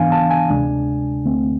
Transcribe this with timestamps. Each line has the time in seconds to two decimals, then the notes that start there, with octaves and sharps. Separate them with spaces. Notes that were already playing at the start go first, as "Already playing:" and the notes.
Already playing: G#2 E3 B3 D4 F5 G#5
0.12 A5
0.30 G#5
0.49 D2 C3 G#3 D4
1.25 D2 D3 A3 C4